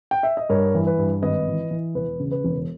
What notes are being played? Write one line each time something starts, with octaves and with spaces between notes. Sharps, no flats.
G5
E5
D#5
G2 A#4 C#5
E3
B4
G2
G#1 B4 D#5
E3
E3
E1 B4
C#3
B4
E1